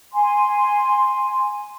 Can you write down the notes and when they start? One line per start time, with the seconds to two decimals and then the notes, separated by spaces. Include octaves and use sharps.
0.14 G#5 C6